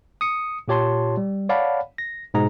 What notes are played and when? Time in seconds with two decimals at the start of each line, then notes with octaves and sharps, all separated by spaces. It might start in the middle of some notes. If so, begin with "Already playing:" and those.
0.21 D#6 C#7
0.68 A#2 F4 G4 C#5 A5 C6
1.17 G3
1.49 C#5 D5 F5 F#5 A5 B5
1.98 A#6
2.34 G#2 B2 D#4 G#4 A#5